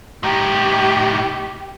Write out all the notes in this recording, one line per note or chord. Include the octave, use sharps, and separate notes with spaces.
A2 D#4 G4